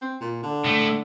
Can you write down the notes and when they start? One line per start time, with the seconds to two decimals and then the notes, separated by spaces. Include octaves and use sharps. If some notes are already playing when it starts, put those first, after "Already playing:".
0.01 C4
0.21 A#2
0.43 D3
0.64 A2 A3